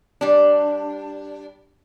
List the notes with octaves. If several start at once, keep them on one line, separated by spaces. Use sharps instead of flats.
G3 D4